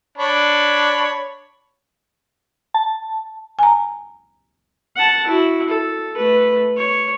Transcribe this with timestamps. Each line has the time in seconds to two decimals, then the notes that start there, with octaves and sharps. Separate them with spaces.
0.18 D4 C#5 B5
2.74 A5
3.59 G#5 A#5
4.96 F#5 A5
5.27 E4 F#4
5.68 A4
6.17 A3 B4
6.77 C#5